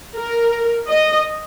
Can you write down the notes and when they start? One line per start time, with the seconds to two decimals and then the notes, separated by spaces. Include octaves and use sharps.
0.15 A#4
0.89 D#5